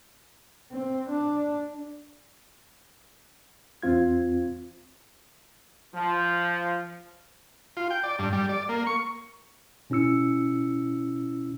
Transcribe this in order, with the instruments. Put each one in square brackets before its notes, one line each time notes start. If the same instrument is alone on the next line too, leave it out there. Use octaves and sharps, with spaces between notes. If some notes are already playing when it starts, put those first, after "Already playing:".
[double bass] C4
D4
[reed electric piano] E2 C4 F4 G#6
[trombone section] F3
[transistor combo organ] F4
G5
D5
G2
G3
D5
A#3
C#6
[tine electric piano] B2 C#4 E4 E6 C#7